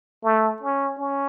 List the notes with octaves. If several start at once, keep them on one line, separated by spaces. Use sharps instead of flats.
A3
C#4
C#4